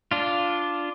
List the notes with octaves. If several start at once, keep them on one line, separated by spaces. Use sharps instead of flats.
D4 F4